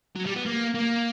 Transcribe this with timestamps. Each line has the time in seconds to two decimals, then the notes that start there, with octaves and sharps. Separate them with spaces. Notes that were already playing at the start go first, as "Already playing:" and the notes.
0.16 F#3
0.26 G3
0.35 B3
0.46 A#3
0.75 A#3